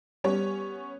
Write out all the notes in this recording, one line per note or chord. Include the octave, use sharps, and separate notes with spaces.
G3 B3 C#4 C#5